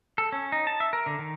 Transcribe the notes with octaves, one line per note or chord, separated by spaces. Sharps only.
A4
C#4
D#4
A5
E5
A#4
D3
D#3